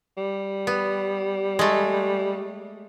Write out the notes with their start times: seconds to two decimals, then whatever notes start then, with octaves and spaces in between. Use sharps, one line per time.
0.18 G3
0.67 B3
1.59 G#3 A3